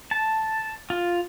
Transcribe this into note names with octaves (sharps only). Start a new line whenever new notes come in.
A5
F4